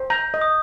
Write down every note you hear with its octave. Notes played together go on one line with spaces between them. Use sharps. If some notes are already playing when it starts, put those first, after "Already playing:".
Already playing: C5
A#5 G6
D#5
D#6